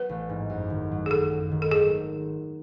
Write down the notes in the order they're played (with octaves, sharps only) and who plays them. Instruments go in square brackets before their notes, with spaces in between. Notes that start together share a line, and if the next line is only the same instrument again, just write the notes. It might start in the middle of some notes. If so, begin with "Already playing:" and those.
Already playing: [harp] F#3 B3 [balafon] B4
[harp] A1
G#2
F#2
D#3
F#3
[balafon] G#4
[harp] F#2 [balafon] A4
[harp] F#2
D#3
[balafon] A4
[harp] G#1 [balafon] G#4